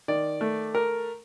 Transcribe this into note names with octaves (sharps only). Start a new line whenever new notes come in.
D#3 D5
A3
A#4